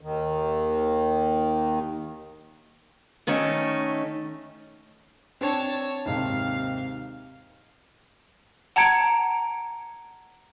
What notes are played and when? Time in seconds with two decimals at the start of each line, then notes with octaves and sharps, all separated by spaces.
0.01 D#2 D#3
3.27 D#3 A3 C#4 D#4
5.41 C4 D4 C#5 A5
6.06 D#2 G#2 C3 F5
8.76 F#5 A5 A#5 G#6 C#7 D7